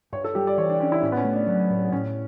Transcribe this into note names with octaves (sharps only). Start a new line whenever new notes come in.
G2 C#5
A4
G3 G4
D5
E3 C#5
D4
C#4 D4
E4
A2 C#4
B3
C#4
A3
D4
F#3
A2
A2 C#4